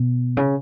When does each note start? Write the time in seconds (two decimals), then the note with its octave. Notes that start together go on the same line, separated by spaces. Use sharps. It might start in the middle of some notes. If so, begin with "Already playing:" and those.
Already playing: B2
0.37 C#3